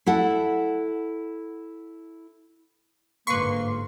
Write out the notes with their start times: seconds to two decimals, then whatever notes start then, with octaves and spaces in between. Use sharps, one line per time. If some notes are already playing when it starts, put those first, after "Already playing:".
0.06 E4 A4 F#5
3.27 G1 G#2 A#3 B4 C6 C#6